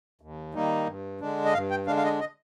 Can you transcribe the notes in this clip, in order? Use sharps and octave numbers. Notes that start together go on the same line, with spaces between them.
D#2
D#3 G3 A#3 D#4
G2
D3 G#3 D4
D#5
G2 F5
G5
D3 G#3 D4 F5
F5
D#5
D#5